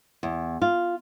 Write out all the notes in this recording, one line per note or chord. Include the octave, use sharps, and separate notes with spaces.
E2
F4